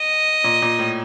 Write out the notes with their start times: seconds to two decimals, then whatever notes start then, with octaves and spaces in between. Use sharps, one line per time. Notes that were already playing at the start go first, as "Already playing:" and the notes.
Already playing: D#5
0.44 A#2
0.62 A#2
0.79 A2